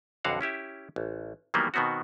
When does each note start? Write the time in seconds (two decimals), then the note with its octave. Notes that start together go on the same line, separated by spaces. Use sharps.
0.24 B1 F2 D3 F#4 F5 F#5
0.41 C#4 E4 G4 E5
0.96 A1
1.54 D#3 E3 F#3 G3 A#3 B3
1.74 B2 D#3 B3 C4 F#4